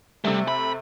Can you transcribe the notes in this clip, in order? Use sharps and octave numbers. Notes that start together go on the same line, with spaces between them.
C3 G3 A3
B5